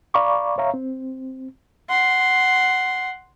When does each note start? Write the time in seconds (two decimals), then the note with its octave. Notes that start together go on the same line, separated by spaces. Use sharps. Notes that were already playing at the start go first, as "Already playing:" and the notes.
0.14 D5 F5 A#5 B5 C#6 D6
0.58 C#5 E5 F5 A#5
0.74 C4
1.89 F#5 C6